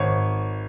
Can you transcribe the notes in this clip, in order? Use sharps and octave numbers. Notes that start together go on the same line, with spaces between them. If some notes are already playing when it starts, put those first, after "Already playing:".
Already playing: G#1 C#5